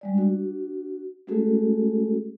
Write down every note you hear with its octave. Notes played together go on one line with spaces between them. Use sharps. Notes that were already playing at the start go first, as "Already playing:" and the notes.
G3 G#3 D5
D4 F#4
G#3 A3 C#4 F#4 G#4 A4